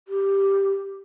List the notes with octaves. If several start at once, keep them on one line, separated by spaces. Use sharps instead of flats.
G4